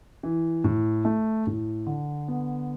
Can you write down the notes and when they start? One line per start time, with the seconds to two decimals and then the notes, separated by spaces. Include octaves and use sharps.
0.23 E3
0.64 A2
1.05 A3
1.47 A2
1.87 D3
2.28 B3